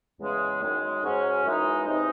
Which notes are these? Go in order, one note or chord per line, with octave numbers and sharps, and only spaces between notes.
E2 C#3 G#3
F#2 D#3 G#3
G#2 F#3 C#4
F#2 E3 G#3 D#4
C3 E3 G#3 D#4